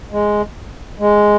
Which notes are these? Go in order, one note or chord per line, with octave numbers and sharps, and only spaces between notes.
G#3
G#3